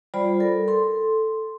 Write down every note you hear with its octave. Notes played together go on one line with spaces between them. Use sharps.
G3 F4 C5 D5 B5
A4 A#4
A4 C6